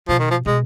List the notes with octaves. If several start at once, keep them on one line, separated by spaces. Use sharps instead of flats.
B2 F3
D#3
F3
B2 G#3